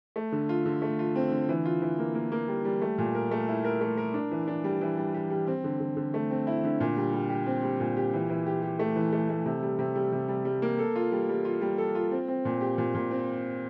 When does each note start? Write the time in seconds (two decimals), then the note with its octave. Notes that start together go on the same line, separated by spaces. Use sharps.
0.16 A3
0.32 D3
0.49 F4
0.65 D3
0.82 A3
0.99 F4
1.16 C4
1.32 D3
1.49 E3
1.65 F4
1.82 E3
1.99 A#3
2.15 A#3
2.32 A#3
2.48 G3
2.65 G3
2.82 A3
2.98 A#2
3.15 A#4
3.31 A3
3.48 E4
3.64 A#4
3.81 A3
3.98 A#4
4.14 D4
4.31 E3
4.48 D4
4.64 G3
4.81 E3
4.98 G3
5.14 G4
5.30 G3
5.47 C4
5.64 D3
5.80 D3
5.97 D3
6.14 A3
6.31 C4
6.47 E4
6.64 D3
6.80 A#2
6.97 G3
7.13 G3
7.30 G4
7.46 C4
7.63 G3
7.80 A#2
7.97 G4
8.13 E3
8.30 E3
8.46 G4
8.62 G4
8.79 A3
8.96 E3
9.13 A3
9.30 A3
9.46 C3
9.63 G3
9.79 C3
9.95 G3
10.13 C3
10.29 G3
10.45 G3
10.62 A#3
10.79 A4
10.96 F4
11.12 G3
11.29 G3
11.45 F4
11.61 G3
11.78 A4
11.95 F4
12.12 C4
12.28 C4
12.45 A#2
12.61 G4
12.78 A#2
12.95 A#2
13.11 C4